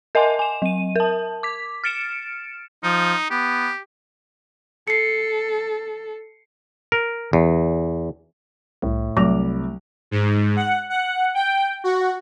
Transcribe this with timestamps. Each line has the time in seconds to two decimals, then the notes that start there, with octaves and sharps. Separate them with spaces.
0.15 A#4 D#5 F#5 G#5 C6
0.39 G#5 E7
0.62 F#3 D#7
0.96 A#4 A5
1.43 D6 B6
1.84 F6 A6 C#7 D7 E7
2.83 F3 D#4
3.31 B3 G4
4.88 A4 C7 C#7
6.92 A#4
7.33 E2
8.82 C2 A2
9.17 C2 F#3 A3 D6 F7
10.11 G#2
10.56 F#5
10.90 F#5
11.35 G5
11.84 F#4